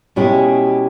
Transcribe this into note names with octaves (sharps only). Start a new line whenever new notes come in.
B2 G#3 C#4 E4 G4